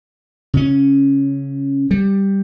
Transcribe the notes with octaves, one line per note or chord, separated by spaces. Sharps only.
C#3 C#4
G3